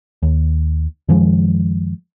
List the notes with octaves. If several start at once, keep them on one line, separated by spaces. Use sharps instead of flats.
D#2
F#2 D#3 F3 G#3